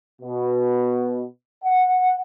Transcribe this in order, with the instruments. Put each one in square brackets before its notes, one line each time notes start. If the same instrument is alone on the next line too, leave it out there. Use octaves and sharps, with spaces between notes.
[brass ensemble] B2
F#5